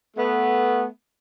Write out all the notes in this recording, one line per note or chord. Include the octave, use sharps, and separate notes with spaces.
A3 B3